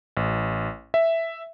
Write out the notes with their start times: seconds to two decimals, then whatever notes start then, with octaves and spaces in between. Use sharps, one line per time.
0.17 A1
0.94 E5